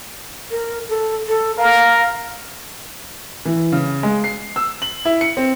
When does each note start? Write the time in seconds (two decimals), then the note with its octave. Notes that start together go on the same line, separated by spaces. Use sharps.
0.51 A#4
0.89 A4
1.28 A4
1.58 A#4 F5
3.45 E3
3.72 C#3
4.03 G#3
4.24 C7
4.56 E6
4.82 F#7
5.05 E4
5.21 C#7
5.37 C4